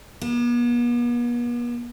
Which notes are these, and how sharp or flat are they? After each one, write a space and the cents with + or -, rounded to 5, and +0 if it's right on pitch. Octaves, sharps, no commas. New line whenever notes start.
B3 -45